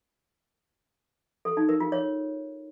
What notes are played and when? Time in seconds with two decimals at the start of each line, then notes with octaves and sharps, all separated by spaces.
1.45 A4
1.57 D#4
1.69 A#4
1.80 F4
1.92 C#5